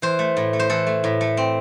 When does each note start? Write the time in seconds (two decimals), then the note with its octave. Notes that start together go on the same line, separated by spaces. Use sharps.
0.02 E3 C5
0.19 A3
0.37 A2
0.53 A3
0.59 C5
0.70 E3 A4
0.87 A3
1.04 A2
1.21 A3
1.37 C4